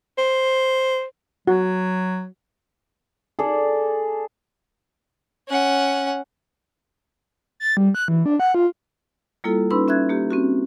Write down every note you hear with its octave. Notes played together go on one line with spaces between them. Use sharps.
C5
F#3 F#4
G#4 A4 D5
C#4 F#5
A6
G3
F#6
E3
D4
F#5
F4
G3 A#3 E4 F4 A4
C#4 D#4 B4 B5 C6 E6
C#4 E5 F#6 G#6
A#3 G4
C4 C#4 F#4